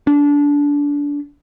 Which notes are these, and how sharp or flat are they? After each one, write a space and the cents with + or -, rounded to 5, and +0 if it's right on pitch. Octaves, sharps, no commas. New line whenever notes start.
D4 -25